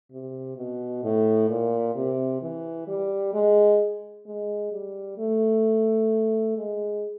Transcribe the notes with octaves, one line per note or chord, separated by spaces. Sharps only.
C3
B2
A2
A#2
C3
E3
G3
G#3
G#3
G3
A3
G#3